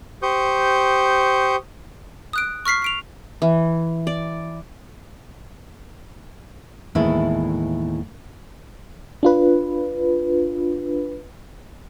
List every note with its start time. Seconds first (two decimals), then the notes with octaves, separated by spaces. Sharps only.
0.22 G4 C5 C#6 D#6 G6
2.33 D#6 F#6 D7
2.65 C#6 F6 B6 C7
2.82 B6 D7 F7
3.42 E3
4.07 D5
6.95 D#2 A2 E3 G#3 B3 E4
9.23 D4 F4 B4